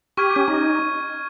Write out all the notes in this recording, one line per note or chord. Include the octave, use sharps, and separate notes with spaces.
G4 C#6 F6 G#6 D#7
C#4
D#4